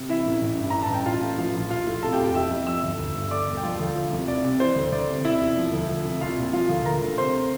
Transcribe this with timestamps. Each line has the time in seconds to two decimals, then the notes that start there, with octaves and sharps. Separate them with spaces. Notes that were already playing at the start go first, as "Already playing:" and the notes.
Already playing: C3
0.09 E3 E4 E5
0.25 A1
0.41 A1
0.57 G2
0.70 E3 A#5
0.82 A5
0.90 A1 G5
1.06 A1 F4 F5
1.22 A2
1.38 F3 F4 F5
1.54 A#1
1.70 A#1 F4 F5
1.87 A2
2.03 C3 A4 A5
2.13 G4 G5
2.19 F1
2.24 G4 G5
2.35 E3 E5 E6
2.51 F2
2.67 F3 E5 E6
2.83 G1
2.99 G1
3.15 G2
3.31 D3 D5 D6
3.47 E1
3.57 G5
3.63 F3 F4 F5
3.80 D2
3.95 F3
4.12 C2
4.28 C2 D5
4.44 C3
4.60 E3 C5
4.76 D2
4.92 D2 D5
5.09 C3
5.25 C3 E4 E5
5.41 E1
5.57 F3
5.73 D2
5.89 F3
6.05 C2
6.21 C2 F4 F5
6.37 A#2
6.53 F3 F4 F5
6.69 D2
6.85 D2 A#4 A#5
7.02 D3
7.18 C3 C5 C6